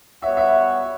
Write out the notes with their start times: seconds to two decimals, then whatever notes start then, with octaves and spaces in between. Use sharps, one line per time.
0.22 G3 B3 F#4 C#5 E5 F#5
0.37 E5